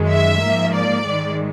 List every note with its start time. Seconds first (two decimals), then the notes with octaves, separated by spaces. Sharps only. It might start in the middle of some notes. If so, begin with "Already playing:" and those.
Already playing: F#2 D#3 G#3
0.11 E5
0.42 G#2 F3 A#3
0.74 D5
1.06 G#2 D#3 G#3